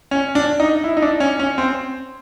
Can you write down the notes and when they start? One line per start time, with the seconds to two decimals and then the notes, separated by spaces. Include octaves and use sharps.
0.11 C#4
0.35 D4
0.60 D#4
0.84 E4
0.97 D#4
1.02 D4
1.20 C#4
1.40 C#4
1.58 C4